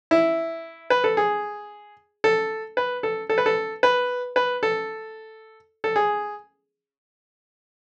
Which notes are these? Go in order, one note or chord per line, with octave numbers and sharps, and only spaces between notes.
E4
B4
A4
G#4
A4
B4
A4
A4
B4
A4
B4
B4
A4
A4
G#4